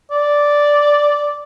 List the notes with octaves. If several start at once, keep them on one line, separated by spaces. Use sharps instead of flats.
D5